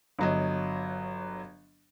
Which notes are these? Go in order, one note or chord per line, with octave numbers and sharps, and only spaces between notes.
G1 F#3 D#5